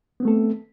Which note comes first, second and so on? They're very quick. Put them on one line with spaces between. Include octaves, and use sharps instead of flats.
B3 C4 A3 A4